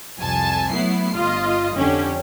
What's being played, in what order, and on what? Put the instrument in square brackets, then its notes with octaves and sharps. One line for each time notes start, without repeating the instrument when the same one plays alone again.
[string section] C2 F2 G#5 A5
F#3 A3 B3 E4 C7
G1 F4 D#5
F2 D3 C#4 G4